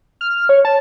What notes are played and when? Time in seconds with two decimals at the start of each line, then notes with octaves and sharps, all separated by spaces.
0.21 F6
0.49 C#5
0.65 A5